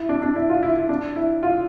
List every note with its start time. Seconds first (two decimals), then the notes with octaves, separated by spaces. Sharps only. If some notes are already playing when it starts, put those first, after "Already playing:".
Already playing: E4
0.09 D4
0.22 D4
0.36 E4
0.50 F4
0.63 E4
0.76 E4
0.89 D4
1.16 E4
1.43 F4